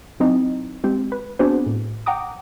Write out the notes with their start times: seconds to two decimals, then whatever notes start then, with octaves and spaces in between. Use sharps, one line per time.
0.20 F#3 C4 D#4 E4
0.84 G#3 C4 G4
1.12 B4
1.39 B3 C4 D4 F#4 G#4 C5
1.67 A2
2.06 F#5 G5 A#5 D6 D#6